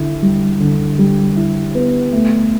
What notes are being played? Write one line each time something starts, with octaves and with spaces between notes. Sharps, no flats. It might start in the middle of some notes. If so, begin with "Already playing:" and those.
Already playing: D3 E4
G3
D3
G3
E4
B3
A3